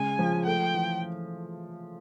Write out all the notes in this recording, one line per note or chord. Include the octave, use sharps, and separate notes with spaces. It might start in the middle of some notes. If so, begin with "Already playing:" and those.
Already playing: C#3 G#3 G#5
F3
A3 G5
E3